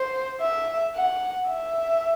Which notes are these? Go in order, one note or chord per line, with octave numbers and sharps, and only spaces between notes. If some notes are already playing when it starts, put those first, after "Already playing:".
Already playing: C5
E5
F#5
E5